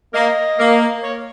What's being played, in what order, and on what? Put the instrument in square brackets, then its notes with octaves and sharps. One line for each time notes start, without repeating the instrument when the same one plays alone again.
[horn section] A#3 [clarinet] D#5
[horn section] A#3
[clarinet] C#5